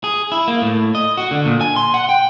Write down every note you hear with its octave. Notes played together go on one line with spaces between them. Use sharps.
G#4
E4
A#3
A2
D#5
F#4
D3
A#2
G#5
C6
F#5
G5